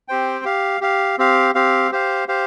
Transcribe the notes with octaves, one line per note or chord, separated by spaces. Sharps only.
C4 G4 C5 G5
G4 F5
G4 F5
C4 G4 F5
C4 G4 F5
G4 C5 F5
G4 C5 F5